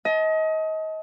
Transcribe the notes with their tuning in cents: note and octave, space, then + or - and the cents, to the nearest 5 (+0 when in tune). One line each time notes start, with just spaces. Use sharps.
D#5 +30 A5 -25